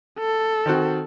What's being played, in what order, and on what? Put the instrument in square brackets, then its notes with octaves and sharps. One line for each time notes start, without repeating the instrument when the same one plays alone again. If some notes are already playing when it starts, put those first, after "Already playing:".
[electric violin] A4
[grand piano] D#3 C4 F#4